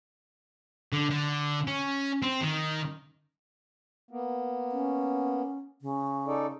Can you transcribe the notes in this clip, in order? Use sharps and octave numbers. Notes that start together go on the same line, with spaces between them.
D3
D3
C#4
C4
D#3
A#3 B3
C#4
C#3
D#4 A4 D5